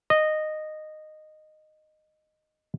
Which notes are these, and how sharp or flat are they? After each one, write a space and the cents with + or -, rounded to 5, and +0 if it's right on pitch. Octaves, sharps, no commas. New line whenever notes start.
D#5 -10